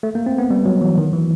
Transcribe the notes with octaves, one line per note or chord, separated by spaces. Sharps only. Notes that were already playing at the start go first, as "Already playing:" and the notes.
A3
A#3
C4
B3
G3
F#3
E3
D#3
E3